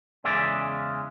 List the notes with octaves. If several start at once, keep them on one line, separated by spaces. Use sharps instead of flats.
E2 C#3 E3 G#3 C#4 D5 E5